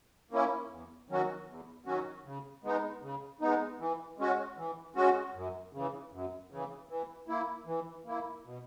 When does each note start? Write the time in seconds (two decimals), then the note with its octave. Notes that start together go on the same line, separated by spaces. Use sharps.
0.31 A#3 C#4 E4
0.70 E2
1.09 D#3 F#3 C#4 F#4
1.48 E2
1.86 D#3 F#3 C#4 F#4
2.25 C#3
2.64 G#3 B3 D#4
3.02 C#3
3.41 G#3 B3 D#4
3.79 E3
4.18 G#3 C#4 F#4
4.58 E3
4.95 G#3 C#4 F#4
5.35 F#2
5.73 C#3 E3
6.12 F#2
6.50 C#3 E3
6.89 E3
7.28 A#3 E4
7.66 E3
8.06 A#3 E4
8.45 B2